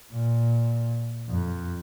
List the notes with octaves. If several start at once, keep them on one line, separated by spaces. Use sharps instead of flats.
A#2
F2